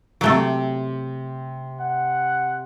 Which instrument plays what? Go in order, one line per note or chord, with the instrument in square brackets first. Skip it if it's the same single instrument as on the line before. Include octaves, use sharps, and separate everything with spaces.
[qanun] C3 G5 D6 [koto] F#3 A3
[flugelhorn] F#5